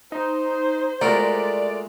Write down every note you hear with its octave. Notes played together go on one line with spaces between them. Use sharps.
D#4 C5
G#3 A3 F4 F#4 A#4 D5